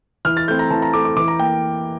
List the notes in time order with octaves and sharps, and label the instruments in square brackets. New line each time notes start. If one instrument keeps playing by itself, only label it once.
[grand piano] E3 F6
A6
A3 C4 G6
A#5
E3 A5
A#5
A3 C4 D6
D6
E3 D6
A#5
A#3 G5